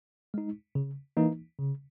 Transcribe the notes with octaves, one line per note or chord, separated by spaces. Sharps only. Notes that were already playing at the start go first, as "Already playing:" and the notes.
G#3 D#4
C#3
E3 A#3 D#4
C#3